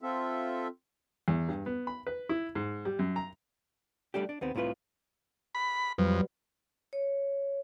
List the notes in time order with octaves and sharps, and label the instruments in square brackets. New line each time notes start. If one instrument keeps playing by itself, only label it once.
[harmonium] C4 F4 A4 E5
[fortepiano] E2
G2
B3
B5
B4
E4
G#2
G3
F#2
A#5
[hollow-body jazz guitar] G3 A3 D4 G4
D4
D#2 B3 C4
C2 A2 C3 F4 B4
[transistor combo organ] B5
[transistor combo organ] F2 [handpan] F#3 G3 B4
[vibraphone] C#5